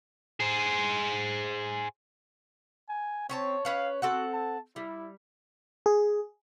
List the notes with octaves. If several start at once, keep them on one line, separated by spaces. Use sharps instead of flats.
G#4 C5
G#5
C4 C#4 C#5 A5
C#4 B4 C#5 F5
C4 F#4 A4 F#5
A5
G3 E4
G#4